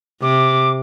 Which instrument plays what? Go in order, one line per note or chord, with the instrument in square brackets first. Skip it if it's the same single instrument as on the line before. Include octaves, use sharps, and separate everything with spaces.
[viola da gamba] C3 [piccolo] D6